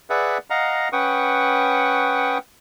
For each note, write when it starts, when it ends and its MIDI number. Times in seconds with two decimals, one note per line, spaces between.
0.10 0.38 68
0.10 0.38 71
0.10 0.38 74
0.10 0.38 76
0.10 0.38 78
0.50 0.89 75
0.50 0.89 77
0.50 0.89 78
0.50 0.89 82
0.93 2.38 61
0.93 2.38 71
0.93 2.38 78
0.93 2.38 79
0.93 2.38 85
0.93 2.38 87